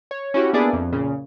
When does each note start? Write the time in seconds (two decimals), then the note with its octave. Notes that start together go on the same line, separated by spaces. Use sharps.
0.11 C#5
0.34 C#4 E4 F#4 G4
0.53 A#3 B3 D4 E4 G#4 D5
0.73 F2
0.92 A#2 C#3